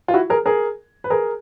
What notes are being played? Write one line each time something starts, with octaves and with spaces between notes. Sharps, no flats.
F4
E4 F#4
G#4 A#4
G#4 A#4
B4
G#4 A#4